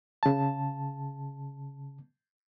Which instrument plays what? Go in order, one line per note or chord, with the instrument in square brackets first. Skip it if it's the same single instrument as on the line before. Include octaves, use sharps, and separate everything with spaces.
[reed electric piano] C#3 A5